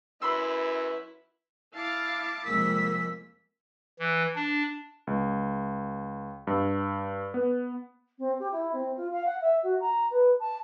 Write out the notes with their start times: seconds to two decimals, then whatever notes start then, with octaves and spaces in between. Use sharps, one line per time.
0.22 F#2 E4 B4 B5 C6 E6
1.74 E4 F5 A5 D6
2.45 C2 F2 G#3 A#3 E6 B6
3.99 E3
4.35 D4
5.07 C#2
6.47 G2
7.34 B3
8.19 C4
8.39 G4
8.52 E4
8.73 C4
8.97 F4
9.12 F5
9.26 F#5
9.41 E5
9.63 F#4
9.81 A#5
10.11 B4
10.40 A5